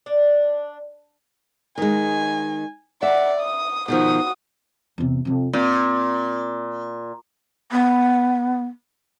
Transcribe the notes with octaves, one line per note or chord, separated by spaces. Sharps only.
D4
D#3 G#3 G#5
D5 E5 F#5
D#6
B2 D#3 F3 F#4 D#6
E2 C3
F2 C3
A#2 C4
B3